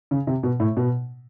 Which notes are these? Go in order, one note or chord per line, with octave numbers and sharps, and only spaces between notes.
C#3
C3
B2
A2
B2